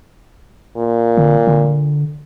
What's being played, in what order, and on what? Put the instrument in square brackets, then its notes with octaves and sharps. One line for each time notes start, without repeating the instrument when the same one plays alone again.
[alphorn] A#2
[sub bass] D3
D3